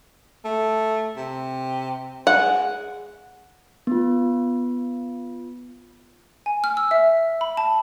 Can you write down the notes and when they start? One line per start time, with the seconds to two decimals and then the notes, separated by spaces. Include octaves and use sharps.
0.45 A3
1.17 C3
2.27 G#3 F#5
3.87 B3 F4
6.46 G#5
6.64 F6
6.77 E6
6.91 E5
7.41 B5
7.57 A5